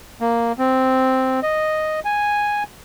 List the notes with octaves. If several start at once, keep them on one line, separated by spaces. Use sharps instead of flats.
A#3
C4
D#5
G#5